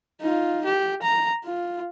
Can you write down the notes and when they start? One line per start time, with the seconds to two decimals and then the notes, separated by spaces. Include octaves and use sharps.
0.21 D#4 F4
0.65 G4
1.02 A#5
1.44 F4